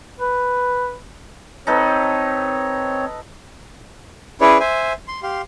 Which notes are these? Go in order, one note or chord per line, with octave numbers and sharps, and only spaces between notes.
B4
C4 D#4 A4 B4 C#5
C#4 E4 G#4 B4 C#5 D5
C5 E5 G#5
C6
G4 F5 C6